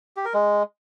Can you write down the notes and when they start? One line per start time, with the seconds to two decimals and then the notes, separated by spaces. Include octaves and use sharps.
0.16 G4
0.25 A#4
0.34 G#3